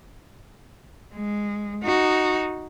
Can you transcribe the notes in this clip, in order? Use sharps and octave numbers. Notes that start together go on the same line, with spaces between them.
G#3
D#4 F#4